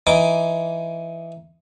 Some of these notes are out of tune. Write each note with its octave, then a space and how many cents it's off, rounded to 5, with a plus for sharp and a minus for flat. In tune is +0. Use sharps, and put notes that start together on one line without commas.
E3 +15 D#4 +10 D6 -10